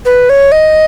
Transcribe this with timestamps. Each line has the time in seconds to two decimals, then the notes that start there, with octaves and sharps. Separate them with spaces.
0.05 B4
0.30 C#5
0.52 D#5